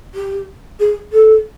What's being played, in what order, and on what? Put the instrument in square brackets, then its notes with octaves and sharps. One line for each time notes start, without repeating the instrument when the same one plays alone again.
[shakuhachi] G4
G#4
A4